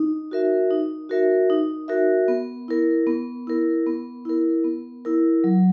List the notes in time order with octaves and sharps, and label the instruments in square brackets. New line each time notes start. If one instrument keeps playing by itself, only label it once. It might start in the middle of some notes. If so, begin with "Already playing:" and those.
Already playing: [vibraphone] D#4
F#4 A#4 E5
D#4
F#4 A#4 E5
D#4
F#4 A#4 E5
B3
E4 A#4
B3
E4 A#4
B3
E4 A#4
B3
E4 A#4
F#3